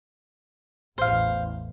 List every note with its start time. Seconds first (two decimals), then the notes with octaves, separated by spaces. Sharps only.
0.98 A1 E2 C5 F5